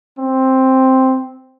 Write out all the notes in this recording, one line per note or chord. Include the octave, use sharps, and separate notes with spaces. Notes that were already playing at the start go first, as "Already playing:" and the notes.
C4